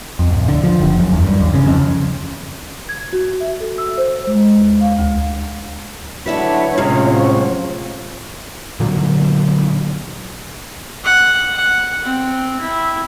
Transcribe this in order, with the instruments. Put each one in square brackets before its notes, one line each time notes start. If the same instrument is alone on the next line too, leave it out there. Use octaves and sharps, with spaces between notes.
[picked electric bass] F2
D1
D3
F3
F#1
F#2
E2
G2
D#2
C#3
F2
[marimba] G#6
F#4
E5
A4
E6
C5
G#3
D#2
F5
D2
[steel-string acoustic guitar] D3 E4 F#4 [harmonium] F#3 A3 D4 [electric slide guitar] B4 [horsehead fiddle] C#5
[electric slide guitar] A2 C#4 F4 [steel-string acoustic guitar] C3 G#3 [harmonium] A#5
[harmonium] F3 F#3 F#4
[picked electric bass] A#2 D3 F#3
[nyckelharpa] F#5
F#5
C4
E4